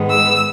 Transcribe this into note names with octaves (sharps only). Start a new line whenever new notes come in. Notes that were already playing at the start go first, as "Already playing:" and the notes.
Already playing: G#2 D#3 G#3 B3
E6